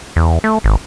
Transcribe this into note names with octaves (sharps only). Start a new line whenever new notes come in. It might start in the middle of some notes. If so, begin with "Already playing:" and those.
E2
A3
G#1